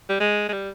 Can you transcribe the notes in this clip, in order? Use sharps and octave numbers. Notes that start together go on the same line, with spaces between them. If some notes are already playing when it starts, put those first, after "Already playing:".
G3
G#3
G#3
G3